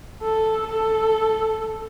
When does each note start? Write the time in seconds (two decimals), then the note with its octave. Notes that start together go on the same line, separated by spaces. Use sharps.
0.22 A4
0.68 A4